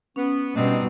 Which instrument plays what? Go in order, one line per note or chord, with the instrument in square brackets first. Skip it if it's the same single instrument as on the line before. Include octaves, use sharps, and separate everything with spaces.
[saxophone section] B3 [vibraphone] C#4
[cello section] B2 G3 [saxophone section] C4 D4 D#4